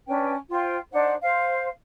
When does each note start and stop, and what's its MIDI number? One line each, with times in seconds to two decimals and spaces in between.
0.07 0.34 61
0.07 0.34 62
0.07 0.34 71
0.07 0.34 79
0.51 0.76 65
0.51 0.76 72
0.51 0.76 79
0.51 0.76 84
0.92 1.12 62
0.92 1.12 63
0.92 1.12 72
0.92 1.12 78
1.22 1.68 72
1.22 1.68 77